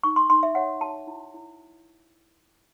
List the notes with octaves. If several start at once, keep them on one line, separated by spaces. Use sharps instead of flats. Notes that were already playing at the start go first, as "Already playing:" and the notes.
D#4 C#6
C6
D#4 C6
E5
C#5 F#5
F#4 A5
E4
E4